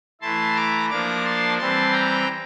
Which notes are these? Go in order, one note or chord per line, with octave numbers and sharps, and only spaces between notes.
E3 A3 E4 A5 C6
A#5 D6
F3 A#3 D4 A#5 D6
A5 C6
E3 G3 C4 A5 C6
G5 A#5